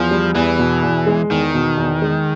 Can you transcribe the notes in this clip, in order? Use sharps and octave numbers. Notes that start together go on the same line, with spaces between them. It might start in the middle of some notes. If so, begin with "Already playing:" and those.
Already playing: E2 F3
G3
E2 E3
B2
E2
G#3
E2 D#3
B2
E2
G#3